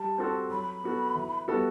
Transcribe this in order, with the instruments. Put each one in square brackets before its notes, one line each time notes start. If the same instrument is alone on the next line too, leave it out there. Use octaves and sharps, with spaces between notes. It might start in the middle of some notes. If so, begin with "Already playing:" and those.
Already playing: [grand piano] G3 [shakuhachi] A5
[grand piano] C4 F#4 A4
[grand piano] F#3 [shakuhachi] B5
[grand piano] B3 F#4 A4
E3
G3 B3 F#4 A4